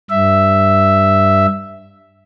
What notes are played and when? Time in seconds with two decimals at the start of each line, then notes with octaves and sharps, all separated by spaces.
0.11 G2 E5